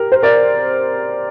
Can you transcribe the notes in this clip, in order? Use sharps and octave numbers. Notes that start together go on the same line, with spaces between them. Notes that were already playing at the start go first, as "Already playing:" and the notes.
Already playing: G4 A#4
C5
A#4 D5